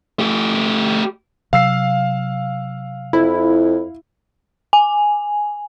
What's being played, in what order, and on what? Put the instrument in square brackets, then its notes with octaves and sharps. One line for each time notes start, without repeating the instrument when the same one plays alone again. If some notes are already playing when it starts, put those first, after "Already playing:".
[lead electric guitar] A3 G4
[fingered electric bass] C3 F#3 [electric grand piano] F5 E6 C7
[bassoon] F2 [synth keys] E4
[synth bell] G#5